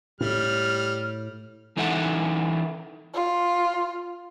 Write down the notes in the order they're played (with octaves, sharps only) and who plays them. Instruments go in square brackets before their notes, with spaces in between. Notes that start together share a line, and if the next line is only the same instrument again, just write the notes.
[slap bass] A2 [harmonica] G3 F6
[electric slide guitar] E3 D#4 E4 A4 F#5
[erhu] F4